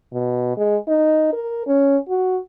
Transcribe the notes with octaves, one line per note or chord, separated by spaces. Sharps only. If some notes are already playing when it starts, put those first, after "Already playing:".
B2
G#3
D#4
A#4
C#4
F#4